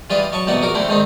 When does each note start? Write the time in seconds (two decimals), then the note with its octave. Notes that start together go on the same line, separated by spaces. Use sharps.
0.10 E3 G3 F4 B4 D5 D#5
0.32 F#3 D#5 A5 C#6
0.47 C2 B2 E3 D#4 D5 F#5
0.62 A#1 F#4 A#4 D6 D#6
0.74 D3 A3 C4 E4
0.89 G#2 D#3 C4 D4 D#4